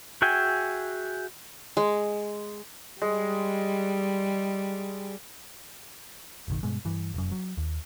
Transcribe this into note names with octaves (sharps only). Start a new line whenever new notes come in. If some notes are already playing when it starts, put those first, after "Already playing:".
F#4 G#4 E5 G5 G#5
G#3
G3 G#3
F#1 B1 D#3
G2 B2 G#3
G2 E3
F1 F#2
F#3
D#2